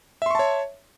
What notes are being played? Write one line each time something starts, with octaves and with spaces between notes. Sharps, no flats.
C#5 E5 A5 C6 C#6